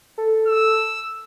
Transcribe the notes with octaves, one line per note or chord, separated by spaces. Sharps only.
A4
E6